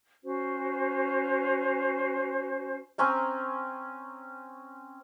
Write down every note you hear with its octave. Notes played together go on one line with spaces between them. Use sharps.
C#4 F#4 C5
C4 C#4 G#5 A#5